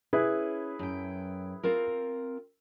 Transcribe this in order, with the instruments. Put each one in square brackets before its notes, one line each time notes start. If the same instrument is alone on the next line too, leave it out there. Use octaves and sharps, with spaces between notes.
[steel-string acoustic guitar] C#4 [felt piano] E4 G#4 B4
[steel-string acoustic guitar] F#2 G5
C4 F4 A#4